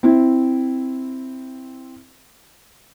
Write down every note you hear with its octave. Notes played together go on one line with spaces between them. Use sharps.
C4 E4